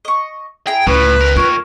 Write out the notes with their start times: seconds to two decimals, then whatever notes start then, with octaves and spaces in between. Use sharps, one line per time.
0.05 D#5 C#6
0.67 E4 G#4 G5 A#5
0.87 C#2 A2 B4 C#5 B5
1.21 D#2 A#4
1.36 F4 C#5 F6